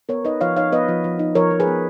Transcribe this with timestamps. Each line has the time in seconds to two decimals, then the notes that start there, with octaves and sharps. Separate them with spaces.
0.09 B3 A#4 C#5
0.25 D#4 B4 D#5
0.41 F3 C#5 F5
0.57 D#4 C#5 F5
0.72 B3 B4 D#5
0.88 F3
1.04 F3
1.19 D#4
1.35 F3 A#4 C#5
1.51 F3
1.60 G#4 B4
1.67 B3